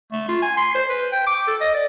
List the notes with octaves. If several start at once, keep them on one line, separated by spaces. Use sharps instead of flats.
A3
F4
G#5
C6
C5
B4
G5
D6
A4
D#5
D5